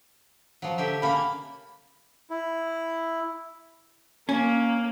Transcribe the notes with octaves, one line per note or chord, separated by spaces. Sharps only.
F3 F#3
D3 G4 E5
C#3 A#3 B5
E4
A#3 C#4